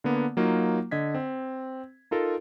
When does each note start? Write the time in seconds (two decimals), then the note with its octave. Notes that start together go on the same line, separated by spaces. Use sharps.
0.04 D3 A#3 B3
0.37 F#3 A#3 D#4 F4
0.91 D3 D#5 G#6 B6
1.15 C4
2.11 D#4 F4 A4 A#4